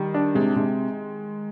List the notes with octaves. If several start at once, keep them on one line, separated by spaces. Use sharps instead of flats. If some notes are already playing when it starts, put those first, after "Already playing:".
Already playing: D#3 G3
D4
C3 G#3
C3 G#3